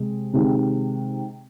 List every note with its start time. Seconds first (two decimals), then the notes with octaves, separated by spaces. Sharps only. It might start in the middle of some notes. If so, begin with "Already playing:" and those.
Already playing: C3 G#3
0.33 C3 D#3 G#3